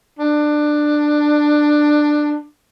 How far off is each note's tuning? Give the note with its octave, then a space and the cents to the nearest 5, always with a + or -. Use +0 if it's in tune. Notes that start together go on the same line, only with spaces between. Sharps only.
D4 +15